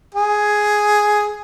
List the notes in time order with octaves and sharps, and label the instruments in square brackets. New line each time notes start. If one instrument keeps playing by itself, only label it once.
[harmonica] G#4